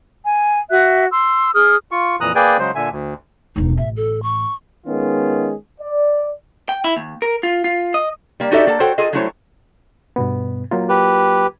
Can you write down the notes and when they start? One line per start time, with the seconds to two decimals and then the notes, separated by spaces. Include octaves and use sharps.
0.25 G#5
0.70 F#4 E5 F#6
1.12 C6 E6
1.54 G#4 D#6 F6
1.91 F4 C#6
2.21 F2 A#2 E3 A#5 D#6 F#6
2.35 A#3 G#4 B4 D5 G5 G#5
2.59 C#3 F#3 G#3 C5
2.75 A#2 D3 E5 G#5
2.91 D2
3.56 E1 C#2 D#4
3.77 A1 E5
3.96 A4
4.23 C#6
4.87 D#3 G#3 B3 C#4 F4 G#4
5.81 D5
6.69 G5
6.84 E4
6.97 D#2
7.22 A#4
7.43 F4
7.64 F4
7.94 D#5
8.40 G3 A#3
8.51 D#4 F#4 G4 A4 D5 E5
8.67 A#3 A4 F#5 A5
8.80 F#4 A4 C5 C#5 F#5 G5
8.98 F4 G#4 A4 D#5
9.13 F#3 G3 A3 E4 C5 C#5
10.16 G2 B2 B3
10.71 F#3 A#3 F4
10.89 G4 B4